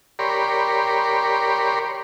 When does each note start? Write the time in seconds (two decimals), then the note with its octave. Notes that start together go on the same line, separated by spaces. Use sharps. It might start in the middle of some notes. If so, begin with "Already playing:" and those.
0.19 G4 A#4 C#5 D5 B5 C6